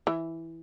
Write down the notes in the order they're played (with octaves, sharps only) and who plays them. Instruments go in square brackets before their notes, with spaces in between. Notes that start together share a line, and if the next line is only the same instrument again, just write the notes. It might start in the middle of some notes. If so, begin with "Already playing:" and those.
[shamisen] E3